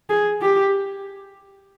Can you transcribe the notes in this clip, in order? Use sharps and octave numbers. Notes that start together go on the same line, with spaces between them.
G#4
G4